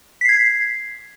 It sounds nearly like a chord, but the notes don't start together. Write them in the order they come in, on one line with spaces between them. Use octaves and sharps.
B6 C7 G#6